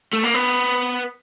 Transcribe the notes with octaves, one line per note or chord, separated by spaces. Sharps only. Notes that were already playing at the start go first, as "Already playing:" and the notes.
A3
A#3
B3